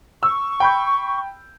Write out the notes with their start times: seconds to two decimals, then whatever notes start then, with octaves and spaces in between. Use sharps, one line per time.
0.23 C#6 E6
0.60 G5 B5 G6